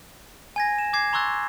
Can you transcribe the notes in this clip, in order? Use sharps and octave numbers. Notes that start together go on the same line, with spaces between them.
G#5 G#6 A#6
E7
D6 G#6 C7
A#5 C6 C#6 E6 F#6 A6